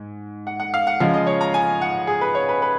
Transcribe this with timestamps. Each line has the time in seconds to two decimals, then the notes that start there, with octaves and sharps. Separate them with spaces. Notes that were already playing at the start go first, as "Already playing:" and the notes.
Already playing: G#2
0.47 F#5
0.60 F#5
0.74 F5
0.87 F#5
1.00 C#3 F3 G#3 F5
1.13 D#5
1.26 C#5
1.41 A#5
1.54 G#5
1.81 F#5
2.07 G#4
2.21 B4
2.35 C#5
2.49 B4
2.62 B4